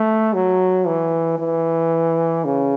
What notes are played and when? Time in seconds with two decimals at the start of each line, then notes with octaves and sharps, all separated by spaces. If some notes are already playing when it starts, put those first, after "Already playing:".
Already playing: A3
0.33 F#3
0.87 E3
1.39 E3
2.45 C#3